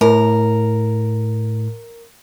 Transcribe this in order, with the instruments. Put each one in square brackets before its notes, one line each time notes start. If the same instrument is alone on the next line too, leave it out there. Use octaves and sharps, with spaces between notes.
[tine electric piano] A2 [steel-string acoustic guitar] A#4